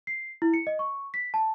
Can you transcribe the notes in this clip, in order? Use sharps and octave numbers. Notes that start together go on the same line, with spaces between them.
C7
E4
C#7
D#5
C#6
B6
A5